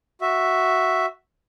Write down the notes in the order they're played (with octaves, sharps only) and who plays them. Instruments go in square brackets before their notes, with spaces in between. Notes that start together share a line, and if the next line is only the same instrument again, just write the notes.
[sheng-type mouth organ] F#4 E5